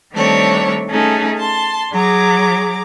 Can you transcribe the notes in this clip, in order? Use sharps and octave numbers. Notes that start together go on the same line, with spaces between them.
D#3 G3 A3 C4 D4 C#5
A3 C#4 D#4 G#4 A4
A5 C6
F#3 G#4 A#5 D6